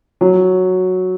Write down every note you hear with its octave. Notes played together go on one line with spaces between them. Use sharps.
F#3